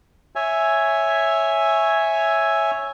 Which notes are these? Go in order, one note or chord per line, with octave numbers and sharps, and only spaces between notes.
C#5 E5 G#5